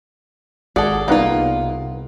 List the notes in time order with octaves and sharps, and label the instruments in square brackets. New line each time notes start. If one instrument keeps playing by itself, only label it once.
[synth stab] G#1 [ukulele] G#4 F#5 [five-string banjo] A4 D5
[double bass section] C2 [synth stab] G3 B3 D#4 [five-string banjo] A#3 F4